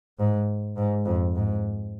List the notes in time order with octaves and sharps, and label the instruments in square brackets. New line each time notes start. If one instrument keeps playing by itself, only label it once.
[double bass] G#2
G#2
F2
G#2